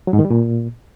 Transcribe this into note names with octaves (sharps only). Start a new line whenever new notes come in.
F#3
G#2
D#3
G3
A#2